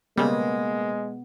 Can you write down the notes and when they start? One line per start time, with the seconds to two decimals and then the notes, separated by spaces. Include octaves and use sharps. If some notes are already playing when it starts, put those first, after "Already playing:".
0.18 C#3 G3 G#3 A#3 B3